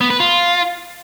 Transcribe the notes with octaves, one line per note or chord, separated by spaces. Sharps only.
B3
B4
F4